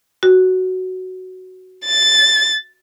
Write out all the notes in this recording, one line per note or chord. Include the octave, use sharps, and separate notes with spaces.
F#4
A6